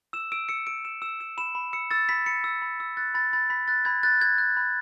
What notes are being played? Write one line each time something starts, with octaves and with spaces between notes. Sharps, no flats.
E6 E7
E6 D7
E6 C#7
E6 D7
E6 E7
E6 E7
E6 E7
B5 E7
B5
E6 C#7
E6 A6
B5 B6
B5 C#7
E6
B5
E6
F#6 A6
B5 A6
B5 A6
B5 B6
F#6 A6
B5 G#6
F#6 A6
F#6 G#6
F#6
B5